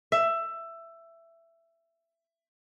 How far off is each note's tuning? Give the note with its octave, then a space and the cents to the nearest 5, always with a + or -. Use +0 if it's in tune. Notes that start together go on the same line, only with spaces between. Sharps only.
E5 +15